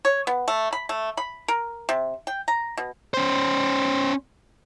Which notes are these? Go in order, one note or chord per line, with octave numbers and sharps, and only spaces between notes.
C#5
B3
A3
B5
A3
B5
A#4
C3
G5
A#5
B2
C#4 C5